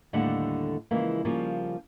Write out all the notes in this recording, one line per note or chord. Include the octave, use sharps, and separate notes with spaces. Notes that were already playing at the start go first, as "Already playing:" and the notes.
D#2 A2 D3 G3 A4 F#5
C#3 E3 F3 G#3 A#3
C#3 F3 G3 A#3 C#4